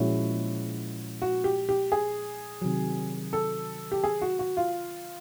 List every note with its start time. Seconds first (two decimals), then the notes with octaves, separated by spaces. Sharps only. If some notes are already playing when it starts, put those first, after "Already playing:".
Already playing: A#2 F3 G#3 C#4 E4 F#4
1.22 F#4
1.44 G4
1.69 G4
1.92 G#4
2.62 C3 D#3 F#3
3.33 A4
3.92 G4
4.04 G#4
4.22 F#4
4.39 F#4
4.57 F4